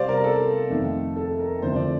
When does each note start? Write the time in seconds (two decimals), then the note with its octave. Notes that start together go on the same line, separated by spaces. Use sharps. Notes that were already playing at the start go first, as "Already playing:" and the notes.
Already playing: C3 G3 C4 C5 D5 F5
0.09 A#4
0.24 A4
0.70 F2 D#3 A3
1.16 A4
1.39 A#4
1.62 F2 D3 F3 A3 C5
1.76 D5